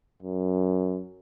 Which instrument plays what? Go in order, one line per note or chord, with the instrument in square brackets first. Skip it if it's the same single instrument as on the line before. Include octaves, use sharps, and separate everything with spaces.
[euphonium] F#2